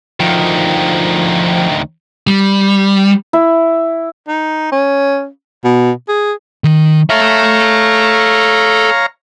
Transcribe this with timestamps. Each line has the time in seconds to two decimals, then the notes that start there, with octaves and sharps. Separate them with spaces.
0.20 D2 D#3 F3
2.27 G3
3.33 E4
4.28 D#4
4.72 C#4
5.64 B2
6.09 G#4
6.64 D#3
7.10 A4 C#5 E5 F5 A#5